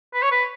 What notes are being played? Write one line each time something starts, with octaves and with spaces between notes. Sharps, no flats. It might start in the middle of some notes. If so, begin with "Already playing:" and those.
B4
C#5
B4